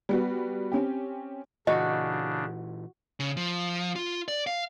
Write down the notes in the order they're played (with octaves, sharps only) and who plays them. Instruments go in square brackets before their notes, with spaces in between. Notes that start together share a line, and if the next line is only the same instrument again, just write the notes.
[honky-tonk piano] G3 B3 F#4
C4 C#4 G4
[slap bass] A#2 E3 [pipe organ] C#3 D4 [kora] F#4 [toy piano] D#5
[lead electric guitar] C#3
F3
F4
D5
F5